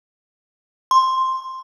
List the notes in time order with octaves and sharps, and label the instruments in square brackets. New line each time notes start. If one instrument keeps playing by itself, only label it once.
[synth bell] C6